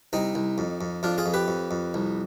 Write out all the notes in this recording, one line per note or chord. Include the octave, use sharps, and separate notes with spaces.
C2 C4 D#4
C2
F2
F2
F2 D4 F4
F4 G#4
F2
G4 B4
F2
F2
C2